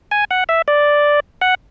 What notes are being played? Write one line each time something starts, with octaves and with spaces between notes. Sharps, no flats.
G#5
F#5
E5
D5
F#5